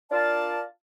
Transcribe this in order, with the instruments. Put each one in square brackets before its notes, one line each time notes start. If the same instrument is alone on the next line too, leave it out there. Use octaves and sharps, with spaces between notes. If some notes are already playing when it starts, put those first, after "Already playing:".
[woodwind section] D4 F4 A#4 D5 F5 A5